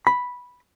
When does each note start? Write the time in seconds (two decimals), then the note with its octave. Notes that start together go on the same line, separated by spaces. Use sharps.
0.07 B5